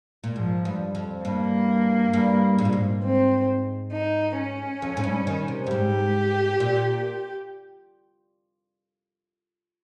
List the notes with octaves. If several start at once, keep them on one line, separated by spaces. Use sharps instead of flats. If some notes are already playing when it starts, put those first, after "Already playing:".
A#2
G#2 F3
G2
F2
G2 A#3
G2
G#2
A#2
G#2
C4
D#4
C#4
F2
G#2
G2
D#3
C3
G2
G#2 G4
A#2